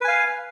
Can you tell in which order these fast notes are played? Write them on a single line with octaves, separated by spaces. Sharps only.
B4 G#5 F5